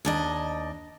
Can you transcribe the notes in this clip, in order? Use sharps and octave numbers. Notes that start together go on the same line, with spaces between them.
D#2 D4 D#5